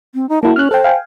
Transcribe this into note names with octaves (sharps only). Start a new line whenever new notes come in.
C4
D#4
A#3 E4 F#4 A5
C#4 F6 F#6
A4 C5 G5
F5 G5 G#5